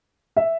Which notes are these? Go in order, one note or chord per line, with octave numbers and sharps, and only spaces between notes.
E5